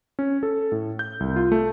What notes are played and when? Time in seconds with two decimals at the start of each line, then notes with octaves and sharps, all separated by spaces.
0.19 C#4
0.43 A4
0.72 A2
0.99 G6
1.20 C2
1.36 F4
1.52 A3